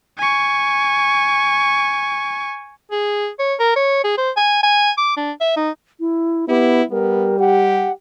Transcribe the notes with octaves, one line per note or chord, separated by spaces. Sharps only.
G#5 C#6
G#4
C#5
A#4
C#5
G#4
C5
G#5
G#5
D6
D4
E5
D#4
E4
B3 E4 G4
G3 B3 A#4
G4 F#5